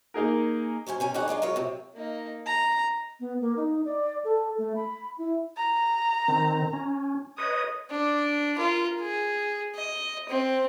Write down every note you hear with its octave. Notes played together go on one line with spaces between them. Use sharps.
A#3 D#4 G#4 A#4
F#3 C#4 C5 G#5
C3 C#4 G#5
F2 G3 D#4 C#5 F#5 G#5
G#3 D4 D#4 F4
F#3 G#3 F4 A#4 C#5 D#5
F#2 C3
A#3 D#4
A#5
B3
A#3
D#4
D5
A4
A3
B5
E4
A#5
D#3 C4
C#4
B4 C#5 D#5 D#6
D4
F4 A#4
G#4
D#5
C4